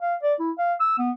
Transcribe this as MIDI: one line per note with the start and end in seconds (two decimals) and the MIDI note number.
0.02 0.15 77
0.23 0.34 74
0.40 0.51 64
0.58 0.74 77
0.80 0.94 88
0.99 1.11 59